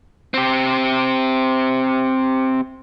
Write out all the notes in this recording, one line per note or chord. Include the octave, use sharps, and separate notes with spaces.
C4 G4